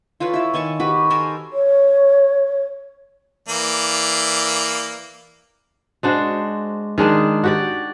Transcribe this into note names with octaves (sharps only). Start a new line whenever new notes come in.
F4 A4 B4 C#5
E4 E5
D#3 G#5 A5 C#6
F#4 G4 B4 B5
A4 A#4 C5 G#5
C#5
E3 A#3 D5
G#3 D4 F#4 C5
D#3 G#3 D4 G#4
F#4 G4 D5